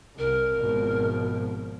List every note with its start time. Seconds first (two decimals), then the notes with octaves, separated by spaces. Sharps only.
0.18 C2 A#4
0.59 G#1 B2 F3